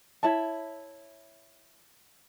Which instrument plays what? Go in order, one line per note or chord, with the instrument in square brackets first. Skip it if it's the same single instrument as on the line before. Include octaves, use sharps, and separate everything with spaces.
[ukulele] E4 C#5 A5